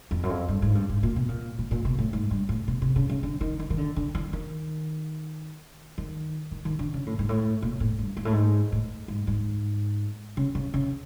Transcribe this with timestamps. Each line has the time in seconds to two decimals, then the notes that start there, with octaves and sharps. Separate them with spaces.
0.11 F2
0.23 F#2
0.30 F2
0.48 G2
0.62 G#2
0.75 G2
0.89 G#2
1.03 A#2
1.16 B2
1.28 A#2
1.59 A#2
1.71 A#2
1.85 B2
1.98 A2
2.13 G#2
2.31 G2
2.49 A2
2.68 B2
2.82 C3
2.96 C#3
3.10 C#3
3.23 D3
3.41 D#3
3.60 D#3
3.70 D#3
3.78 D3
3.96 D3
4.15 E3
4.33 D#3
5.98 D#3
6.51 D#3
6.65 D#3
6.79 D3
6.94 C#3
7.06 A2
7.19 G#2
7.29 A2
7.62 A#2
7.80 A2
7.99 G2
8.17 G#2
8.25 A2
8.33 G#2
8.72 A2
9.08 G#2
9.27 G#2
10.37 C#3
10.55 C#3
10.74 C#3